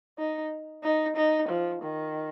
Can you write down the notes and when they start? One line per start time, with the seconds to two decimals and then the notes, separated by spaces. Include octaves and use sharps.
0.18 D#4
0.84 D#4
1.16 D#4
1.49 F3
1.82 D#3